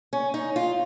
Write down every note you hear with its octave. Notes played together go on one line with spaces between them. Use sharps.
C#4
D#4
F4